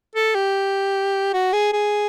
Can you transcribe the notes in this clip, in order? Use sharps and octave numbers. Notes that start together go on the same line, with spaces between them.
A4
G4
F#4
G#4
G#4